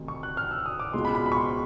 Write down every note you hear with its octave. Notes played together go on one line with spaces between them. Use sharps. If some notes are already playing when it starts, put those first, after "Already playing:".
Already playing: D2 C3 D#3
C#6
F#6
F6
E6
D#6
D6
C#2 B2 G#3 C6
B5
B5
B5
C#6
C6